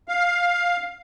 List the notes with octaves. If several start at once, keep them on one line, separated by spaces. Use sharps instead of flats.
F5